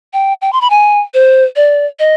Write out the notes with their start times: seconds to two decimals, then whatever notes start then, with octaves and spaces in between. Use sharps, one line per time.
0.13 G5
0.42 G5
0.53 C6
0.61 B5
0.70 G#5
1.14 C5
1.56 D5
1.99 D#5